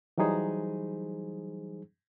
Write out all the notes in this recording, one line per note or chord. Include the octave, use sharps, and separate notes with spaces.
E3 F#3 G3 D#4 G#4 C5